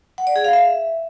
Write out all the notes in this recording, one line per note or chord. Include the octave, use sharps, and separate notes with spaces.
F#5
D5
G#4
F5
E5